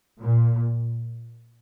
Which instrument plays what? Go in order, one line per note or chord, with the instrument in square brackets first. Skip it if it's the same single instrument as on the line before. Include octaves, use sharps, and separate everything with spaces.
[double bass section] A#2